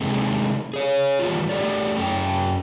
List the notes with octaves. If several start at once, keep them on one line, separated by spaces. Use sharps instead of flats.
C3 D#3 G#3 A3 C4
G#4 C#5
A2 D#3 E3 G3 B3 F4
A3 G4 A4 D5
F#2 C#4 G5